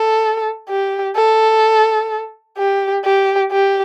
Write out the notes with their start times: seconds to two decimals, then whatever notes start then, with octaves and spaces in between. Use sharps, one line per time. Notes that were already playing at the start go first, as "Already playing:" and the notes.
Already playing: A4
0.69 G4
1.16 A4
2.58 G4
3.05 G4
3.52 G4